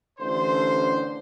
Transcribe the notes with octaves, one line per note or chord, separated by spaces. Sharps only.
A1 D3 C5 C6